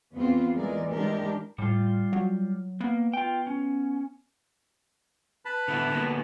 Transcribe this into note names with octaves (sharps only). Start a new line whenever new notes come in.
E2 B3 C4 F4
E3 G#3 A#4 D5
E3 G#3 D4 G4 A#4
A2 G3 F4
F#3
A#3 B3
F4 G5
C#4
B4 A5 B5
D3 B3 E4
D3 A#3 B3